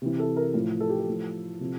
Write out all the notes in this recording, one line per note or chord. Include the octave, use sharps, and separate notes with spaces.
C3 E3
A4
A#4
A2 F3
A4
G4
A4
A2 F3
C3 F3